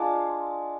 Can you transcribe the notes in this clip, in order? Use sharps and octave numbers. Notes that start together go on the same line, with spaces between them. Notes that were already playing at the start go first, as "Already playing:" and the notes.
Already playing: G#3 D4 F4